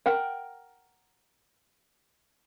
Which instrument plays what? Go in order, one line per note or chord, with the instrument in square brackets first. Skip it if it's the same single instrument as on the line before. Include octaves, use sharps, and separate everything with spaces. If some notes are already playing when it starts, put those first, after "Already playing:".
[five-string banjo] A#4 F#5 G5